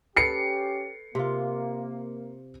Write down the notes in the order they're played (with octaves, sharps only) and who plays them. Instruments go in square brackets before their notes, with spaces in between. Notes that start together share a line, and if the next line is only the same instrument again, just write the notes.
[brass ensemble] C#4 G4 [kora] A4 B4 D5 [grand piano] C7 C#7
[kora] C3 F4 [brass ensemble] A#3